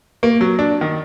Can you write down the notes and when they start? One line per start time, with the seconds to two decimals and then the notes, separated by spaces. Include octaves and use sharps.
0.23 A#3
0.41 F#3
0.59 D4
0.81 D#3